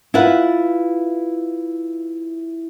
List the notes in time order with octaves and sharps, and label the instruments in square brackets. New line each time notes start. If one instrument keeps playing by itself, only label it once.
[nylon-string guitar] E4 F4 B4 F#5